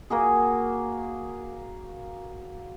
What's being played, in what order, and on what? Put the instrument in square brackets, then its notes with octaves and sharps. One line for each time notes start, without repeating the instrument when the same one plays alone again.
[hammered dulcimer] A#3 F#4 G#4